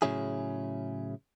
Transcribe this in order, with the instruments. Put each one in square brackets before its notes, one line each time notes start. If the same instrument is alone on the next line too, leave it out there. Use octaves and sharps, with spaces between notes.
[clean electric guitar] A2 C#3 F#3 C#4 E4 G#4